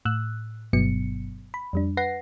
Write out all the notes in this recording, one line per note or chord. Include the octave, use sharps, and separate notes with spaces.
A2 E6 F#6
G1 G2 B2 F#3 B3 C#7
B5
F2 G3 D4
B4 F#5 A#6 C7